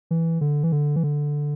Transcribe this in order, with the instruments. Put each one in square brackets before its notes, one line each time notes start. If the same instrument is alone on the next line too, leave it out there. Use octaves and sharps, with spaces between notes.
[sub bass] E3
D3
E3
D3
E3
D3